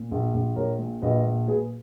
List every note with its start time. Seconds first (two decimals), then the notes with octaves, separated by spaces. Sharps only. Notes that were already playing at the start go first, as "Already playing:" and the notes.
Already playing: A#2
0.11 A#1
0.34 A#1
0.56 A#1 A#4 C#5
0.79 A#2
1.02 A#1 B4 D#5
1.24 A#2
1.47 A#2 G#4 B4